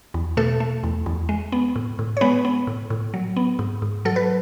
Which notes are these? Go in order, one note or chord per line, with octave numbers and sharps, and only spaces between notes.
E2
B2 A3 A4
A3
E2
E2
G#3
B3
A2
A2
C#5
G#3 B3 B4
B3
A2
A2
F#3
B3
G#2
G#2
F#3 A4
B4